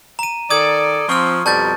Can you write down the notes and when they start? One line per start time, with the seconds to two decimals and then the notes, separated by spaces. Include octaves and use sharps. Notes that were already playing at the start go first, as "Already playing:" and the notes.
0.19 A#5 D#7
0.50 D#3 A4 D5 D#6 G#6
1.09 F3 C4 C#6 F6
1.46 F2 B2 G3 A5 G6 A6